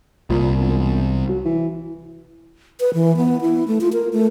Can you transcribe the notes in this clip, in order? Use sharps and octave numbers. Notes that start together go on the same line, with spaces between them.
C2 A#2
E1
F#3
E3
B4
E3
B3
E4
A3
F4
A#4
A3